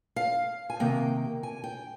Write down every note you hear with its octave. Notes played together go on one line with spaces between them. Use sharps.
F5
G#5
C3 D#3 A#3 G5
G#5
G5